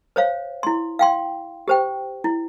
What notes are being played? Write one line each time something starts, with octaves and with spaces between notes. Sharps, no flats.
C5 C#5 F5
E4 C6
F5 G5 C6
G4 C5 G5
E4